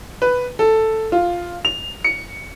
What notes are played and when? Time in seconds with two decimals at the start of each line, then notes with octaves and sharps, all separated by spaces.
0.22 B4
0.59 A4
1.12 F4
1.65 F7
2.05 C#7